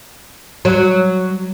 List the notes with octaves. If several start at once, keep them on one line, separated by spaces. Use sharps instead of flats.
F#3